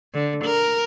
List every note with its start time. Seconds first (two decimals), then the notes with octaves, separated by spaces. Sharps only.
0.14 D3
0.45 A#4